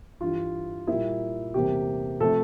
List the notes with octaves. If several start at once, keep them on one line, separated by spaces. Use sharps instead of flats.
G2 E3 G3 F4
A#2 G3 A#3 E4
E2 C3 G3 A#3 G4
C3 F3 A3 A4